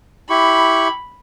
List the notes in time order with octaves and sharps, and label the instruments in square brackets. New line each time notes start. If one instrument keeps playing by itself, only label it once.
[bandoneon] E4 G4 C#6 [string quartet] B5